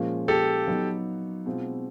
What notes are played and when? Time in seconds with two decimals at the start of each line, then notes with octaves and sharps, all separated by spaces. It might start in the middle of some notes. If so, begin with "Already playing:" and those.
Already playing: A#2 F3 G#3 C#4
0.28 G4 A4
0.68 F#3 B3 D#4
1.46 B2 G#3 C4 F4